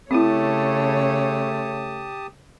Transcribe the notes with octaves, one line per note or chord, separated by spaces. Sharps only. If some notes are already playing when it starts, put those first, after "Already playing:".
C#3 A3 C4 E4 G4 C#5 A5 D#6